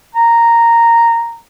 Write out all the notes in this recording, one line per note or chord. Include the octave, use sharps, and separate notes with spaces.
A#5